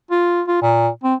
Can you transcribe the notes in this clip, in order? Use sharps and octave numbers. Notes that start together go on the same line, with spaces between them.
F4
F4
A#2
C4